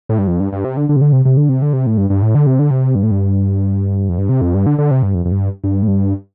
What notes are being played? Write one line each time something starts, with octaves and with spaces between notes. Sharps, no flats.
A2
G2
F2
G2
G2
C3
D3
D3
C3
D3
C3
C3
D3
C3
D3
C3
A2
G2
G2
A2
D3
C3
D3
C3
G2
A2
G2
F2
G2
C3
F2
G2
D3
D3
C3
G2
F2
F2
G2
G2
A2
G2